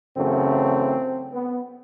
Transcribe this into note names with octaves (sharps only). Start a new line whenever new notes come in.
F#2 C#3 E3 A3 C4
B3